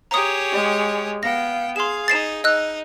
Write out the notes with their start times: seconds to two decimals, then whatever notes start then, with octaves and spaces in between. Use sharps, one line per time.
0.11 G4 G#4 C#5 A#5 D#6
0.52 G#3
1.23 B3 F5 G5 A#6
1.76 G#4 F5 C6 E7
2.08 D#4 A6 C7 E7
2.44 D#4 D#5 E6 F#6